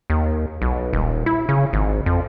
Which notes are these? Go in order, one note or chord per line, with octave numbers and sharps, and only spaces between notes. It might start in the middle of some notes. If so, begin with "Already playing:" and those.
D#2
B1
D#1
E4
C#3
G#1
F2